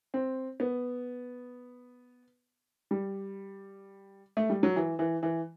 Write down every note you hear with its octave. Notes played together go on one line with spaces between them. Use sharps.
C4
B3
G3
A3
G3
F#3
E3
E3
E3